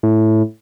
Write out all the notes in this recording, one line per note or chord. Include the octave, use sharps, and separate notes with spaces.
A2